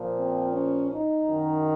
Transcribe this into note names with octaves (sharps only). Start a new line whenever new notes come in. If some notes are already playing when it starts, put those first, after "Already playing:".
Already playing: A#2 F3
C4
C#4
D#4
F#2 D#3